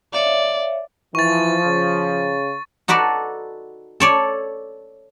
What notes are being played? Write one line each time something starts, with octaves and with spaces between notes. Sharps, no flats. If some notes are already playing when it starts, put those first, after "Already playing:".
C#5 D5 E5 F5
E3 F3 C#6 A6
C#3
D#4 F#4 A4 B4 D5
A4 C#5 D5